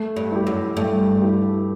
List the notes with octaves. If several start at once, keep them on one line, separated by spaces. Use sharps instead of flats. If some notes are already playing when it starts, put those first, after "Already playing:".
Already playing: A3
G2
E4 G4
F#2
G2 A3
E4 G4